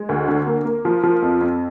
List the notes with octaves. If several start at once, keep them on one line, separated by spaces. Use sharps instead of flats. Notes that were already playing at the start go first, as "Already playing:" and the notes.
Already playing: G#3
D2
D3
A#3
A#3
F3
F3
F2
F2